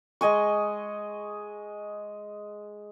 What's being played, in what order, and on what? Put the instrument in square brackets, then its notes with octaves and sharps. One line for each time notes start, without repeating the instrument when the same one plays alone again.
[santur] G#3 D#5 G#5 C#6